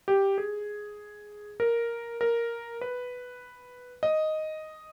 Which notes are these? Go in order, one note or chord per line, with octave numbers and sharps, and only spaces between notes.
G4
G#4
A#4
A#4
B4
D#5